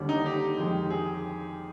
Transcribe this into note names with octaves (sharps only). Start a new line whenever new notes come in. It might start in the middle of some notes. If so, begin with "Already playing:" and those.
Already playing: D#2 D3 G3
D#4
G4
F2 D#3 G#3
G#4